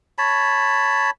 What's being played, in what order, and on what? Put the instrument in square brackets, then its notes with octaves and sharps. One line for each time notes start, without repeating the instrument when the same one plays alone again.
[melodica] C#5 A5 B5